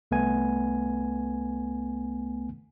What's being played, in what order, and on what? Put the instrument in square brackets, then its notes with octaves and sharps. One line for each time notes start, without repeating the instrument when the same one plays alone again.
[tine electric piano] C2 A3 B3 G#5